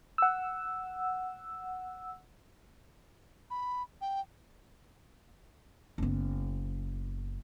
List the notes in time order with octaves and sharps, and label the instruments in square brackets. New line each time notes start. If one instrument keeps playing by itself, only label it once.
[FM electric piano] F#5 E6
[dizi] B5
G5
[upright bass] F#1 B3